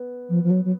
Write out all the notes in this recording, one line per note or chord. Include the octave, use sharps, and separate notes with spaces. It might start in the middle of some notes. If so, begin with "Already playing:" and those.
Already playing: B3
F3
F3
F#3
F#3